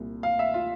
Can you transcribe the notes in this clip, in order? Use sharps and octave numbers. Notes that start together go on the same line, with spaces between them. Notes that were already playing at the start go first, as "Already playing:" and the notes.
Already playing: C2 A#2
F5
E5
F4